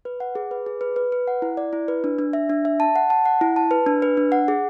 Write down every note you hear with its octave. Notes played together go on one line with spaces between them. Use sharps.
B4
F#5
G#4
B4
G#4
B4
B4
B4
F#5
E4
D5
E4
B4
D4
D4
E5
D4
E5
A5
F#5
A5
F#5
E4
A5
B4
D4
B4
D4
F#5
G#4